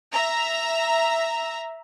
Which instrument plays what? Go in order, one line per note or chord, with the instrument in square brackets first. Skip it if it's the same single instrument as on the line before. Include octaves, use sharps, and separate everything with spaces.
[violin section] E5 A#5